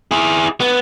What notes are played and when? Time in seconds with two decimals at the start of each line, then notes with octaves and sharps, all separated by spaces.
0.11 E4 G#4
0.60 B3